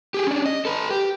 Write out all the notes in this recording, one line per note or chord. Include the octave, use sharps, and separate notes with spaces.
G4 G#4
C#4 D4
D#5
A4 B4
G4